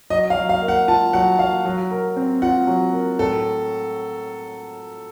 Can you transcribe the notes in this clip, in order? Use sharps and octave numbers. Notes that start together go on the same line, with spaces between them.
F#3 D#5
F5
F#3
F5
A#3
F#5
F4 A5
F#3 F#5
F#3 F5
F#3
A#4
C4
F4 F#5
F#3
A#4
A2 A4